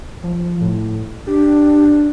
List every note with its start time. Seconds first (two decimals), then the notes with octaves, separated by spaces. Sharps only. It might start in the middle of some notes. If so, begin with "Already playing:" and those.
0.23 F3
0.61 A2
1.27 D4 G4